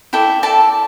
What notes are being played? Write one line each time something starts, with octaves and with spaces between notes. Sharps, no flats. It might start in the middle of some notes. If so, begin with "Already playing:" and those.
E4 A4 D5 G5
E4 A4 D5 A5